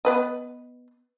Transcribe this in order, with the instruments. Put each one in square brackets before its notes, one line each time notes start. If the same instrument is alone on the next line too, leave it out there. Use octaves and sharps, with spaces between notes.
[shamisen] B3 B4 D#5